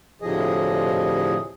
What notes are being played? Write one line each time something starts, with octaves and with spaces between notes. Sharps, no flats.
D2 A2 C3 F3 G#4 D#5